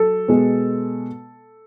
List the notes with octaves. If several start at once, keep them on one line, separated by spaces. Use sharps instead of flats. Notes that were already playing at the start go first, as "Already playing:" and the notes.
Already playing: F#3 A4
B2 G#3